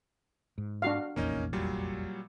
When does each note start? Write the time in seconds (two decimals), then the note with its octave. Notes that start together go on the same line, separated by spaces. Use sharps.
0.58 G#2
0.82 D4 F#4 F5
1.16 F1 A#1 E2 A#3 C#4 D#4
1.53 A#2 F#3 G3